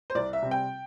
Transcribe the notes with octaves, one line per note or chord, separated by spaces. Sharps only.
C5
C2 D5
E5
C3 G3 C4
G5